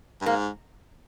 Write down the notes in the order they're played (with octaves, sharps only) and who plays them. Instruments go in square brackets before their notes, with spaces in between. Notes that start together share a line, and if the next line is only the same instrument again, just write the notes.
[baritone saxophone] G2
[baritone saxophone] G#2 [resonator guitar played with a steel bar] A#3